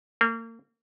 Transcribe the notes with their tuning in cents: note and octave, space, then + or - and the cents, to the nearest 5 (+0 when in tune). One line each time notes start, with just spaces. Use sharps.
A#3 -35